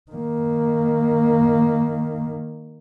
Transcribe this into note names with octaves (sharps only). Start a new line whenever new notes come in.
D#3 A#3